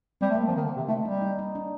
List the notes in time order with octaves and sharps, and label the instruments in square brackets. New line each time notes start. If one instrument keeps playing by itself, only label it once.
[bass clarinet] G3 [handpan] C4
[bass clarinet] A3
[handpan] A#3
[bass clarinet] F3
[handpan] C4
[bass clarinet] D#3
D3
C3
[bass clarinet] A3 [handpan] D#4
[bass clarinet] G3 [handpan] D#4
[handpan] D#4
D#4
D4